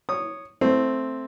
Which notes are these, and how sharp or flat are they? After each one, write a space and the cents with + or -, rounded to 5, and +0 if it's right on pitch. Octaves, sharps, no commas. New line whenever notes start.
C#5 +0 D#6 -15
A3 +0 C4 +0